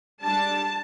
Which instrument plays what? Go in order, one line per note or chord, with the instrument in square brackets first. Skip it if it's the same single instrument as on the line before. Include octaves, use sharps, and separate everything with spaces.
[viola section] G3 D4 A5